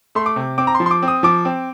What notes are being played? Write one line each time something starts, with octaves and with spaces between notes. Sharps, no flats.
A3 C6
D6
C3
C4 D6
A#5
C6
F3
C6
D6
C4
D#6
F3 D6
C4